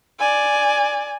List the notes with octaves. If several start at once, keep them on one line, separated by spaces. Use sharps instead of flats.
D5 G#5